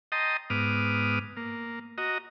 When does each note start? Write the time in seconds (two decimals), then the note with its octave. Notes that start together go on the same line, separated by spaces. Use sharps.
0.12 D#5 G5 A5 A#5 C6 D#6
0.50 G#2 B3 D6 D#6 F6
1.37 A#3
1.98 F#4 D#5 A#5